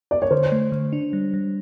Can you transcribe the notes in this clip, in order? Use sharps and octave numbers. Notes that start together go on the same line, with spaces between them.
D5
C#5
D3 C5
A3
D3
D4
G3
G3